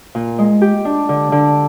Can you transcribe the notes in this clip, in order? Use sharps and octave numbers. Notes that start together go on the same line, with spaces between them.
A#2
G#3
G4
D4
D3
D3